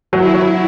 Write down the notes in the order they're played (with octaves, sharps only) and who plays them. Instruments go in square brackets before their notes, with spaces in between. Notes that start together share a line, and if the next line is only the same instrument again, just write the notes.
[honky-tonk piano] F#3 [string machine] E4
[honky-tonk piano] F#3